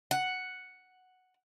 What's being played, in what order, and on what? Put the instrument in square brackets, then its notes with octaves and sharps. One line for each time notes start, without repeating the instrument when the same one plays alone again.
[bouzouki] F#5